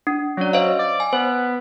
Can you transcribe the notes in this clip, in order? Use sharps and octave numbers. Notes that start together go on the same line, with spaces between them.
D4
F#3 C#4 D5
C5 D#5 F5
D5
G#5
B3 C5